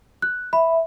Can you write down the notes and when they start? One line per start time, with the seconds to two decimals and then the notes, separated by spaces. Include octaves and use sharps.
0.22 F#6
0.53 E5 B5